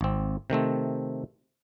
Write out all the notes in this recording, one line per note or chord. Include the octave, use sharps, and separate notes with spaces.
G#1 C4
C3 D#3 A3 C4